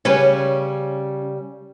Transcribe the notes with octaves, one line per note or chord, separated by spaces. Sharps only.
C#3 G3 C#4 B4